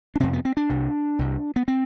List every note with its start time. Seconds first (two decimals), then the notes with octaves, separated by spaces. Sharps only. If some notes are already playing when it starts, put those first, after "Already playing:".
0.16 D4
0.20 F2 C3 C4
0.33 B3
0.45 C4
0.57 D4
0.70 C2 C3
1.19 C2 C3
1.56 B3
1.68 C4